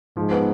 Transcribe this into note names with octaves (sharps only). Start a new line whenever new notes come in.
G#2 F3
B3